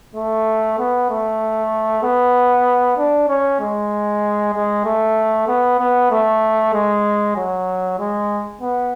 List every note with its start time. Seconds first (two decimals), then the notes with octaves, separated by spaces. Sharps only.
0.15 A3
0.78 B3
1.10 A3
2.03 B3
2.98 D4
3.28 C#4
3.60 G#3
4.54 G#3
4.85 A3
5.48 B3
5.79 B3
6.11 A3
6.74 G#3
7.36 F#3
7.99 G#3
8.61 B3